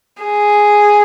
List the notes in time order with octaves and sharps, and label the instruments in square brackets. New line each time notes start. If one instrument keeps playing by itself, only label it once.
[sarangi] G#4